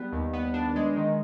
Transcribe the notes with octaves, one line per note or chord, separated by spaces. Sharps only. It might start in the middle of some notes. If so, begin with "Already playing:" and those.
Already playing: G3 B3
D#2
B3
D4
G#3
D#3